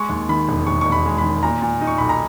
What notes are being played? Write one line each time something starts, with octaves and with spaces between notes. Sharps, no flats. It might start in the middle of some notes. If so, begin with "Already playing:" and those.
Already playing: G#3 C#6
D#2
D#3 B5
E1
E1 C#6
E1 C#6
B5
G#3
B5
D#3
A#2 A#5
A#2
D#4
C#6
B1 B5
A#5